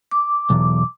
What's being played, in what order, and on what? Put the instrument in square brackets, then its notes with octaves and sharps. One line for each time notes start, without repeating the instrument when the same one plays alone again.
[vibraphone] D6
[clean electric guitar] B1 E2